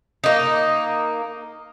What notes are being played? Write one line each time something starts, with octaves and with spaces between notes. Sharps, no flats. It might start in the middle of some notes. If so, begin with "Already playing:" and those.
A#3 D#4